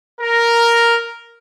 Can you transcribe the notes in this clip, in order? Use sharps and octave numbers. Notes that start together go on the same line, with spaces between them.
A#4